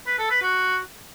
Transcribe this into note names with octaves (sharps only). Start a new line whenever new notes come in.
B4
A4
B4
F#4